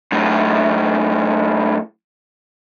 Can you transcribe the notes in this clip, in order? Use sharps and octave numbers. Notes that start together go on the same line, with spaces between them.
F#2 A2